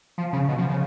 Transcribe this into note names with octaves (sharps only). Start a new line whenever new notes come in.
F3
C#3
B2
F3
C#3